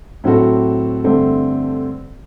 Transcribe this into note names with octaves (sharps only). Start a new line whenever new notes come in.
A2 F#3 C4 F#4 A4
G2 D3 A3 C4